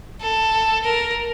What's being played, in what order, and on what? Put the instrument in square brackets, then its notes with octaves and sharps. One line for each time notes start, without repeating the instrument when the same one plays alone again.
[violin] A4
A#4